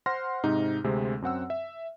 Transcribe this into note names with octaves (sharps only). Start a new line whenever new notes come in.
C5 F#5 C6 F6 A#6
G#2 C3 D#4
D2 C3 G#3 C4
F#2 C4 F#5 E6
E5